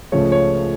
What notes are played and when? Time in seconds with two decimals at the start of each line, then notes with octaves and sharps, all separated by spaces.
0.12 C#2 C#3 F3 A3 C#5
0.32 C#5